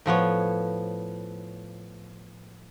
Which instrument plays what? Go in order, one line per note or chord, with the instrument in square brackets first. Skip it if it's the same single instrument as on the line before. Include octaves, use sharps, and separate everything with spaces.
[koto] A2 F3 B3 C#5